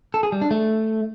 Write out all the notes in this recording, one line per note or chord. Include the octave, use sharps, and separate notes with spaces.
A4
G#4
G3
D4
A3